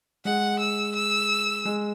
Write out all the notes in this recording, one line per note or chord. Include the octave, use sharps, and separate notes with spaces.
G#3 F#5
E6
E6
G#3